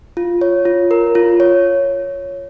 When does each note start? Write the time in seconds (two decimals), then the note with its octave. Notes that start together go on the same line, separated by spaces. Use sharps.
0.17 F4
0.41 C#5
0.65 F4
0.91 A#4
1.15 F4
1.40 C#5